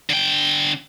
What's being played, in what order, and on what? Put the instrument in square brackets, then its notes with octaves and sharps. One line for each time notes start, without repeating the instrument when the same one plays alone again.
[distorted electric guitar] D3 G5